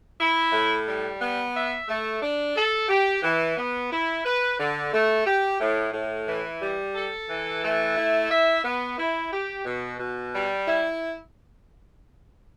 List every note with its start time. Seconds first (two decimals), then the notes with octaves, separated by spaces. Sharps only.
0.19 E4
0.52 A2
0.87 G3
1.20 B3
1.54 E5
1.88 A3
2.21 D4
2.56 A4
2.89 G4
3.22 E3
3.57 B3
3.91 E4
4.25 B4
4.58 D3
4.93 A3
5.25 G4
5.60 A2
5.93 A2
6.27 E3
6.61 G3
6.95 A4
7.29 E3
7.62 A3
7.97 E4
8.30 E5
8.63 B3
8.97 E4
9.32 G4
9.65 B2
9.99 B2
10.33 G3
10.67 E4